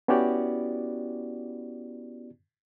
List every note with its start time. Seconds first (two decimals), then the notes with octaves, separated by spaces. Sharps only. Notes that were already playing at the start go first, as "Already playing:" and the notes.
0.08 B3 C#4 E4 F#4 G4 D5